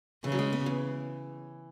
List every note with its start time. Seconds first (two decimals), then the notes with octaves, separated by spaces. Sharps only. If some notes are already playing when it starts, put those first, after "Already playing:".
0.24 C#3 E3
0.32 F#3
0.39 G#3
0.52 B3
0.66 E3